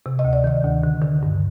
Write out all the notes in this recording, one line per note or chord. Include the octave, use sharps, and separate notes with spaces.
C3
D#5
D2
D5
D#3 D#5
D2
D3
D3
G2